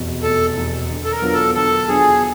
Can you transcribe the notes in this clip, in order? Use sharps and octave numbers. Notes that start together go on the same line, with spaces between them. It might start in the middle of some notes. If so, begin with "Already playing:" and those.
Already playing: F1 E2 B2
F1 A4
E2 B2
D3
A4
A#4
F#3 B3 D4 F4
A4
D3 A4
F#3 B3 D4 F4 G#4